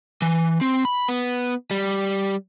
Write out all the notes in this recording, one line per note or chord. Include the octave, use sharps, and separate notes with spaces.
E3
C4
B5
B3
G3